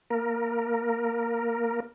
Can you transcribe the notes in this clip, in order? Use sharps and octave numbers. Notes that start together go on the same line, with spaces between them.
A#3 A#4